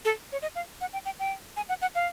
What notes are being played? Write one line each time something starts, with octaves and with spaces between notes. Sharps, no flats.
A4
C#5
D#5
F5
F#5
G5
G5
G5
G#5
F#5
F#5
F5